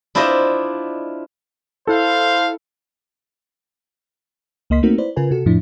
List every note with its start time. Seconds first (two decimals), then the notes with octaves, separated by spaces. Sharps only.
0.15 D4 E4 F4 C5 D#5 E5
1.87 E4 A4 C5 F5
4.70 C#2 A#3 D#5 C6 B6
4.83 A3 A#3 C4 D#4 F#4 A#4
4.98 E4 B4 C5 D5
5.16 C#3 F4 A#4 B4 G#5
5.31 C3 F#4 A4
5.46 F2 A2 F3 D4 E4